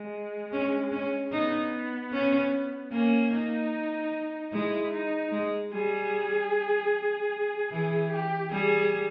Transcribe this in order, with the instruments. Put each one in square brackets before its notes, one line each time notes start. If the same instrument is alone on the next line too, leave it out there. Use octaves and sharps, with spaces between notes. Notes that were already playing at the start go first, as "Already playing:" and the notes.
Already playing: [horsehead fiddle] G#3
[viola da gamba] C#4
C#4
[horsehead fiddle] B3 [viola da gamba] D#4
[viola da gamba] C#4
[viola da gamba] A#3 [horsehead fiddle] C#4
[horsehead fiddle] D#4
[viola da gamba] G#3 [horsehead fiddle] E4
[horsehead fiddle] D#4
[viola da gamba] G#3
[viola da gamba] G3 [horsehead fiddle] G#4
[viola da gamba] E3 [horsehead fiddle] G#4
[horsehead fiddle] G4
[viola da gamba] G3 [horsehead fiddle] G#4